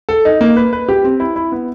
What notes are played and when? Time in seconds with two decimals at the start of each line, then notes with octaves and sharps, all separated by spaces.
0.09 A4
0.25 D#4
0.41 A#3
0.56 B4
0.73 B4
0.89 G4
1.04 C4
1.20 E4
1.36 E4
1.52 B3